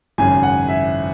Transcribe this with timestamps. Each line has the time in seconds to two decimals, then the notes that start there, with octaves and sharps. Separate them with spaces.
0.18 G#1 F#2 C#3 G#5
0.43 F#5
0.68 E5